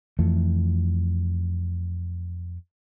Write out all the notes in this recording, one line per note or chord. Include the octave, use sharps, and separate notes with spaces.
F2 E3 A3